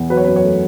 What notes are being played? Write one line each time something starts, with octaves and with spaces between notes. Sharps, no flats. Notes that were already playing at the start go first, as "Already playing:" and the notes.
Already playing: E2
F#3 B4
C#5
B4
F#2
C#5
A3